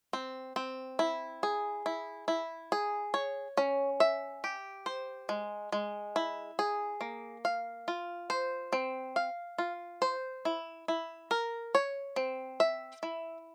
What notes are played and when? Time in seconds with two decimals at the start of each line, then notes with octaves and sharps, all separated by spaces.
0.13 C4
0.56 C4
0.99 E4
1.43 G#4
1.86 E4
2.28 E4
2.72 G#4
3.14 C#5
3.57 C#4
4.00 E5
4.44 G4
4.86 C5
5.29 G#3
5.72 G#3
6.16 E4
6.59 G#4
7.01 A#3
7.45 F5
7.88 F4
8.30 C5
8.73 C4
9.16 F5
9.58 F4
10.02 C5
10.45 E4
10.88 E4
11.31 A#4
11.75 C#5
12.16 C4
12.60 E5
13.03 E4